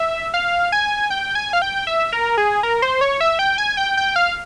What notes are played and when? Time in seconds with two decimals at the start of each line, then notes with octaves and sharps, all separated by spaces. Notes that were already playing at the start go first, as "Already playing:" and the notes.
Already playing: E5
0.34 F5
0.72 G#5
1.10 G5
1.35 G#5
1.53 F5
1.62 G5
1.87 E5
2.13 A#4
2.38 G#4
2.63 A#4
2.82 C5
3.01 C#5
3.21 E5
3.39 G5
3.58 G#5
3.77 G5
3.97 G5
4.16 F5